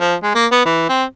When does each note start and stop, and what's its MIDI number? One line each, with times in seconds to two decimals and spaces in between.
0.01 0.15 53
0.23 0.33 56
0.35 0.46 58
0.52 0.62 59
0.66 0.84 52
0.89 1.04 60